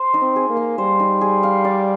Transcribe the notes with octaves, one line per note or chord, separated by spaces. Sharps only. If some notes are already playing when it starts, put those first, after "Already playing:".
Already playing: C5
D#4
C4
G#4
A#3
F5
G3 C5
D#4
G#4
F5
D5